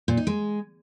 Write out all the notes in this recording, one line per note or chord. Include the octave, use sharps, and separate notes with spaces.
A#2
D#4
G#3